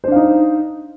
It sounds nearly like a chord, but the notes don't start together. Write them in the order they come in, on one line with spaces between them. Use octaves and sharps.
C5 D4 F5 D#4